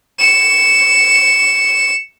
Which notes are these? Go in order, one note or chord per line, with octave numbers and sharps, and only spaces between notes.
C#7 E7